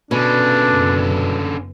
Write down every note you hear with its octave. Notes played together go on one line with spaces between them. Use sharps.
B2 D3 C#4 D4
F#1